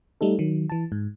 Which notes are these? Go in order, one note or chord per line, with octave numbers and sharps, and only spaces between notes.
G3 A3 D#4 A4
D#3 F#3
E3 A5
G#2